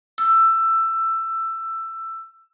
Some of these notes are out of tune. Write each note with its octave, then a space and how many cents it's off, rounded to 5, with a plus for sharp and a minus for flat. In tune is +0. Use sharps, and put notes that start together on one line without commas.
E6 +15